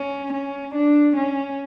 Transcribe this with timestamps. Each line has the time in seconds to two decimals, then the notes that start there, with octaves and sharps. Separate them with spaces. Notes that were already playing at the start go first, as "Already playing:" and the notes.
Already playing: C#4
0.33 C#4
0.75 D4
1.17 C#4